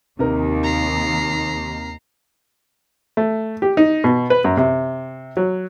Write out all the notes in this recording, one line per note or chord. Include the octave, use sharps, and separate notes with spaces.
D#2 C3 D#4 A#4
A#5 C7
A3
G4
D#4
B2
B4
F#2
C3
F#3